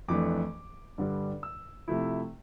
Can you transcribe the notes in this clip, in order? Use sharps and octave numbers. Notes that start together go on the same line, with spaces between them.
F2 E3 A3 D4 D6
G2 D3 G3 D4
E6
C3 F3 A3 E4